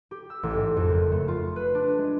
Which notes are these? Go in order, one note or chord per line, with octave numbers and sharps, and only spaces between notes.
G4
E6
A1
G#2
F2
F#1
A3
F4
B4
D4
G#3